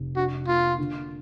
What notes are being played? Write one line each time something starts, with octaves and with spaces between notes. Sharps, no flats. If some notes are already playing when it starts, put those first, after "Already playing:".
Already playing: F1
D4 F#4
A#3 F4
D3